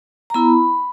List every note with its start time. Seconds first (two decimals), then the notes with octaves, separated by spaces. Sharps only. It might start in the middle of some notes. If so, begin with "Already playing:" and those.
0.30 A#5
0.34 B3 E4 B5